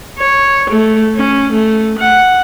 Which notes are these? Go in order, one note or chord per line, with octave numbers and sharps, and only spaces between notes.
C#5
A3
C#4
A3
F#5